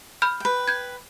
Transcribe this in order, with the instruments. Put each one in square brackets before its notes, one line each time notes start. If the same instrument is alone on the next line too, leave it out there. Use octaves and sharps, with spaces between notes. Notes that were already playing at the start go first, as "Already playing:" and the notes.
[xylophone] B5 F6 G6
[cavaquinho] B4 G5
[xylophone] G6 G#6